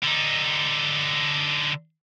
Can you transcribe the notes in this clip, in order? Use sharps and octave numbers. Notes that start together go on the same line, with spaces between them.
D3 D#4